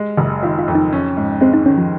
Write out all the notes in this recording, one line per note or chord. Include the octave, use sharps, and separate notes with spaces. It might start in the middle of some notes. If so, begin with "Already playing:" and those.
Already playing: G#3
F#1
D#3 F4
F4
F2
D#4
C#4
G#2
G#3 C4
D#4
D#3 C#4
F3